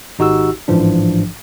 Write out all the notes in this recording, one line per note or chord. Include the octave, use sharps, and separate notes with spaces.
G#1 D#4 F#4 G4 E6
A1 G#2 E3 F3 D4